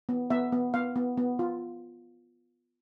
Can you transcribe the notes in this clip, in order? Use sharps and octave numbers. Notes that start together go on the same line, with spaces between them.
B3
B3 E5
B3
B3 F5
B3
B3
F4